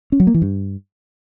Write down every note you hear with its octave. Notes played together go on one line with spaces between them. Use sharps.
C#4
F#3
A#3
E3
G2